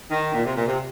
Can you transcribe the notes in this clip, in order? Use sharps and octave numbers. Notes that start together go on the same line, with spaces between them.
D#3
A#2
C3
A#2
C3